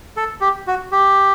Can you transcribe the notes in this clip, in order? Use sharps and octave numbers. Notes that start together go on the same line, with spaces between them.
A4
G4
F#4
G4